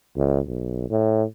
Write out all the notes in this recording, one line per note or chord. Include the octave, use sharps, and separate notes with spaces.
C#2
B1
A2